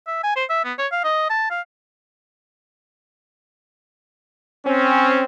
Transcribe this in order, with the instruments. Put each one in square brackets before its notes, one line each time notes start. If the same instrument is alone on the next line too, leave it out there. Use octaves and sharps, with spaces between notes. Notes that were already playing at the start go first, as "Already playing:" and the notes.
[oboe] E5
G#5
C5
E5
B3
C#5
F5
D#5
A5
F5
[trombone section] C4 C#4